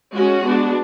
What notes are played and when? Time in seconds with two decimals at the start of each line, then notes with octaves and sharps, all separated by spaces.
0.14 G#3 C#4 F#4
0.43 G#3 B3 D4